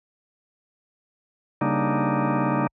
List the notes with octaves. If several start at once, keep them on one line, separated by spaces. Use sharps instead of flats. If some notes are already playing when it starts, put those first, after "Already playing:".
C#3 G3 A#3 D4 D#4